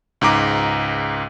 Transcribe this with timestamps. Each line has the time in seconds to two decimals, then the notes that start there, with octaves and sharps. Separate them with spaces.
0.21 C#2 G#2 A#5 D6